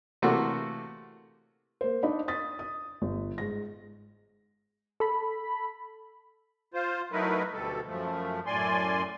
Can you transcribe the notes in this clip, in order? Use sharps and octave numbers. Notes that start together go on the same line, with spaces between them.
C3 E3 A3 A#3 F#4
A#3 C5
D4 D#4 D5 D#5 B5
D#6 A6 B6
D#6
G1
G#2 A#6
A4 B5
F4 C5
F#3 A3 D#4 E4 A#4 B4
D2 B2 G3 A4
F#2 F3 A3
F#2 A2 D5 G#5 C6